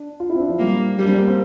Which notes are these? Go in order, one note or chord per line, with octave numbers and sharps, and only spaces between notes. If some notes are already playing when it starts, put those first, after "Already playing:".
Already playing: D4
F4
E4
C4
D4
F3
G3 A#3
G3 A#3
D4
C4
A#3
C4